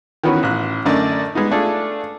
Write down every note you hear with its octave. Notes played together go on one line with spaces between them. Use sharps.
D#3 E3 B3 C#4 F#4 B4
A1 F#6
F#2 D3 A3 A#4 D5 D#5
G#3 B3 D#4
A3 D4 F4 G#4 A4